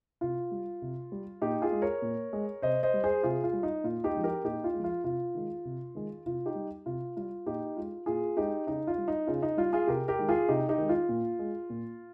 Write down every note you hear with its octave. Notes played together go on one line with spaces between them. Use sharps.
C3 F4
G3
C3
G3
A#2 D#4 G4
F4 G#4
G#3
A#4 C#5
A#2
G#3
C3 C5 D#5
C5 D#5
G3
G#4 C5
C3 F4 G#4
F4
G3
D#4
A#2 F4
D#4 G4
F3 G#3
G4 A#4
A#2 D#4 G4
F4
F3 G#3
F4
C3 F4
D#3 G#3
C3
D#3 G#3
C3 F4
D#4 G4
G3
C3 F4
G3 F4
A#2 D#4 G4
G#3 F4
A#2 F4 G#4
G#3 D#4 G4
C#3 D#4
F4
G3
D#4
C#3 F4
D#4
G3 F4
F4 G#4
C3 G4 A#4
G4 A#4
D#3 G#3
F4 G#4
C3 D#4 G4
D#4 G4
D#3 G#3
F4
A#2
G#3
A#2